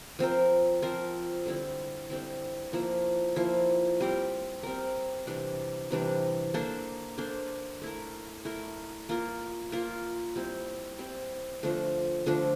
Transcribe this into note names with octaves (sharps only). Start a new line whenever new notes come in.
F3 C4 F4 A#4
F3 C4 F4 A#4
D3 G3 C4 E4
D3 G3 C4 E4
F3 A#3 E4
F3 A#3 E4
G3 C4 G4 A#4
G3 C4 G4 A#4
C3 E3 G3 D4
C3 E3 G3 D4
A#3 D4 A4 C5
A#3 D4 A4 C5
A3 E4 A#4
A3 E4 A#4
A#3 F4 A#4
A#3 F4 A#4
G3 C4 E4
G3 C4 E4
D3 F3 A3 D4
D3 F3 A3 D4